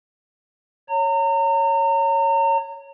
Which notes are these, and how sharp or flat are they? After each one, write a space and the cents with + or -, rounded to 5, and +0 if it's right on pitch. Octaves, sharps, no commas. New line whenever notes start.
C#5 +0 A#5 -35